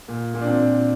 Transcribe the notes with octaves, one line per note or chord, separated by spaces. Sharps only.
A#2
A#2
D4
C4
A#2